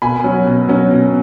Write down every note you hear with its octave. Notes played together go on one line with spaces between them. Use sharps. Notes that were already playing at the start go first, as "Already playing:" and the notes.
B2 G#5 B5
F#3 C#4
B2
F#3 C#4
B2